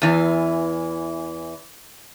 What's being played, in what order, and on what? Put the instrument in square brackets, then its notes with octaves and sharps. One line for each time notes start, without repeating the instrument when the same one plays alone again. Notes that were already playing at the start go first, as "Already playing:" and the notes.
[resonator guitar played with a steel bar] E2 E3